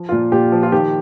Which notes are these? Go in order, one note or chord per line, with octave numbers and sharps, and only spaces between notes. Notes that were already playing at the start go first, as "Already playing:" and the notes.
Already playing: F3
A#2 F4
A#2 G4
F3
F4
D#3 G4